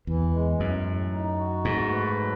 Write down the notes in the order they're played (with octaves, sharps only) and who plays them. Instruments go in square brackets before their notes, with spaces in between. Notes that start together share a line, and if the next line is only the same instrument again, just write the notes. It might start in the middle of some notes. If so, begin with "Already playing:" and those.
[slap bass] E2 [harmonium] E3
[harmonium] G#3
[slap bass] F#2 [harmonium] A2
[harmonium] A2
D#4
F#4
[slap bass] G#2 [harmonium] A3
[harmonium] B4
F#3